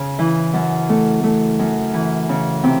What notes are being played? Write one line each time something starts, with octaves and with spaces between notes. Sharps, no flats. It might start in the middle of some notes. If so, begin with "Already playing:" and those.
Already playing: C#3
E3
F#2
A3
A3
F#2
E3
C#3
C3